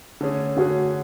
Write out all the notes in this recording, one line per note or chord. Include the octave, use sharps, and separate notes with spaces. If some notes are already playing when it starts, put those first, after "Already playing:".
D3 A3 C#4 G#4
D3 A3 C#4 F#4 G#4